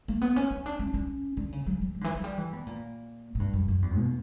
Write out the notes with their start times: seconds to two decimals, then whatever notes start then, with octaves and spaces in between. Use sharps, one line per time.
0.08 A#3
0.22 B3
0.36 C#4
0.51 C#4
0.66 D4
0.79 C#4
0.94 C#4
1.37 D3
1.53 C#3
1.66 F#3
1.81 F#3
1.95 F#3
2.01 D3
2.04 E3
2.15 F#3
2.24 G3
2.38 E3
2.53 B2
2.67 A#2
3.35 A#2
3.40 G2
3.53 F#2
3.68 F#2
3.82 E2
3.98 B2